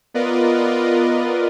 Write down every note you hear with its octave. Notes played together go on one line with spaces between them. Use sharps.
B3 F4 A#4 B4 D5 D#5